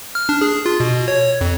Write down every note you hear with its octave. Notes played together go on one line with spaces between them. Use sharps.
F6
D4
G#4
F4
B2
C#5
F2